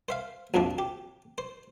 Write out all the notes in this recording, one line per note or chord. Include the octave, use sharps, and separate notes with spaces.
C5 E5 F5
A#1 F2 G#2 C3 F3 D4
G4
C5